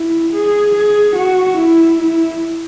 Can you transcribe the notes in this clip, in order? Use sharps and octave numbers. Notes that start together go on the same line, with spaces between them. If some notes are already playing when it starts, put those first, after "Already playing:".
Already playing: E4
G#4
G#4
F#4
E4
E4